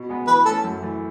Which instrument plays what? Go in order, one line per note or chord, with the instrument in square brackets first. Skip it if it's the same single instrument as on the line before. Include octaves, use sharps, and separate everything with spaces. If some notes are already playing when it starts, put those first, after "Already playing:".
Already playing: [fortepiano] B2
G#3 B3
[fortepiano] E3 [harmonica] B4
[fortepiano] A3 C#4 [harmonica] A4
[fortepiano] F#2
E3 A3